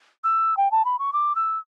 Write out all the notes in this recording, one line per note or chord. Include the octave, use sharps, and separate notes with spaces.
E6
G5
A5
B5
C#6
D6
E6